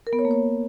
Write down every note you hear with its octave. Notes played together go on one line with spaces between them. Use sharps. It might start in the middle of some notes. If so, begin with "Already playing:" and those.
A#4
B3
C#5
A#3
C#5